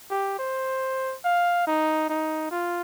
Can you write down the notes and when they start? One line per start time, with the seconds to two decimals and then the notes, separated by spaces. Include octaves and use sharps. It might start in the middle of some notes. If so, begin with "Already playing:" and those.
0.10 G4
0.39 C5
1.24 F5
1.67 D#4
2.09 D#4
2.51 F4